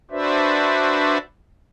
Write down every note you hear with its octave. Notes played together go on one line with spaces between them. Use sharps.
D4 F#4 B4 C5 D5 E5